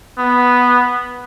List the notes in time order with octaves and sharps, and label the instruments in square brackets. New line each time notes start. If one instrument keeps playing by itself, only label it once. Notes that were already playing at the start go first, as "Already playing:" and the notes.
[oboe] B3